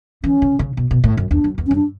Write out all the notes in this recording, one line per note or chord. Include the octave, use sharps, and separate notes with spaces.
E3 C#4
C#3
C#3
B2
B2
A2
F#2
E2 D4
F#2
E2
C#4
F#2
D4